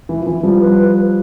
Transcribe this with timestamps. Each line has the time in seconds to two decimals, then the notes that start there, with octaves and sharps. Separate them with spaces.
0.09 E3
0.21 F3
0.27 E3
0.43 F3 G3
0.61 B4